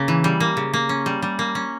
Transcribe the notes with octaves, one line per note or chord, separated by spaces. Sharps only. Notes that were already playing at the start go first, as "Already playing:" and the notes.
Already playing: C#3 A#3
E3
G3
A#3
C#3
A#3
C#4
G3
G3
A#3
C#4